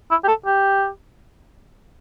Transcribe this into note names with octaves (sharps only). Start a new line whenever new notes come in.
E4
G4
A4
G4